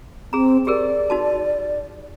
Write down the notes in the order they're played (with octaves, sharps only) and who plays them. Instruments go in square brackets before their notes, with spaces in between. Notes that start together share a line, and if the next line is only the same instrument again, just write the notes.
[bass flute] C4 [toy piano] G#4 A#5
[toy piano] G4 G#4 A#4 [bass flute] D5
[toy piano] D#4 F#4 A5